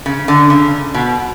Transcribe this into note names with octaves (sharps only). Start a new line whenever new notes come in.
C#3
D3
C#3
B2